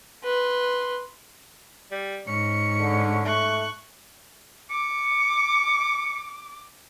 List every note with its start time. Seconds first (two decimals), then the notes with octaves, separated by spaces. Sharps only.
0.24 B4 C6
1.91 G3
2.27 G#2 C#4 C#7
2.80 D3
3.25 A3 C#6 F#6
4.70 D6 C#7